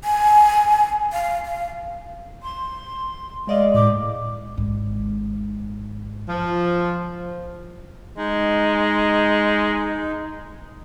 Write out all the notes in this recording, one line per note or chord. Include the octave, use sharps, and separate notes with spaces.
G#5
F5
F5
C6
G#3 D5 D#5 F5
A2 D6
G#1 G#2
F3
G#3 D#4